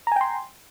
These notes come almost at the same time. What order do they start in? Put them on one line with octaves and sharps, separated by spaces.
A#5 G#5 G5 C6